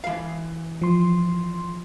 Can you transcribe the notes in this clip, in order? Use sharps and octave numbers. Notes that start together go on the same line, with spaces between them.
E3 F5
F3 C6